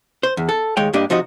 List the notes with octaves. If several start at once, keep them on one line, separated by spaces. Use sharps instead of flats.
C5
E2
A4
D#2 G#3 C#5 G5
G2 A#3 D4 G4 D5 D#5
C3 F3 D#4 F#4 D#5